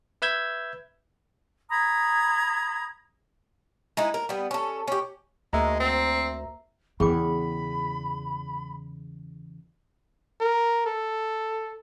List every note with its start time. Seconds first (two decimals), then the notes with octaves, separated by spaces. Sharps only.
0.22 B4 E5 E6 G6 G#6
1.70 A#5 B5 D#6 G#6
3.97 G#3 D#4 E4
4.14 A#4
4.29 G3 B3
4.51 C#4 A4
4.88 C#4 G4
5.53 D2 G#3 A#3 E5 A#5
5.80 C4
7.00 E2 C#3 G#4 G5 B5 D6
10.41 A#4
10.86 A4